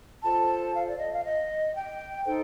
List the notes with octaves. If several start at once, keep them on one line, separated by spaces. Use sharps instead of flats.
F4 A4 C5 A5
F5
D5
D#5
F5
D#5
G5
D#4 A4 C5 G5